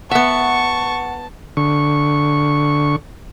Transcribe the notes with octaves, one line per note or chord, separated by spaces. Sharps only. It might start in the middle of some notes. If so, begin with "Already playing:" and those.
B3 E5 F#5 A5 C#6 C#7
D3 C#6